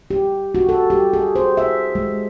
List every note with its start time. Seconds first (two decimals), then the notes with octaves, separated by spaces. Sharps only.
0.11 G4
0.55 F#4
0.69 A4
0.90 G4
1.13 G#4
1.36 C5
1.57 E5
1.95 G#3